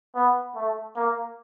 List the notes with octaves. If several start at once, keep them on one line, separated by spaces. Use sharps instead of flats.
B3
A3
A#3